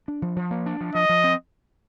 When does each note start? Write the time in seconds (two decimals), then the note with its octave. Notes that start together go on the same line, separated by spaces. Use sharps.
0.08 D4
0.22 F3
0.36 F3
0.51 A#3
0.66 D4
0.81 F3
0.95 F3 D#5
1.09 F3
1.24 C4